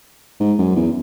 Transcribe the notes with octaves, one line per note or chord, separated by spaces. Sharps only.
G#2
F#2
E2